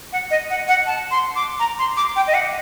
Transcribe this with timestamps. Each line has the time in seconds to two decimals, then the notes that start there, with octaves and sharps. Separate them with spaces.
0.13 F#5
0.31 D#5
0.50 F#5
0.68 F#5
0.87 A5
1.11 C6
1.36 D6
1.60 A#5
1.79 C6
1.97 D6
2.16 G5
2.27 D#5
2.34 F#5